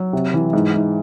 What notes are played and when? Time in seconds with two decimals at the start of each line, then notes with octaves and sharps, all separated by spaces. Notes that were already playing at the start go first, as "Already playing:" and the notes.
Already playing: F#3
0.13 C3
0.34 E3
0.53 G#2
0.74 G#2